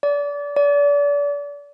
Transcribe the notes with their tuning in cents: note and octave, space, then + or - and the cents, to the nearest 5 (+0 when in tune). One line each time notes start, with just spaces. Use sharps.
D5 -30
D5 -35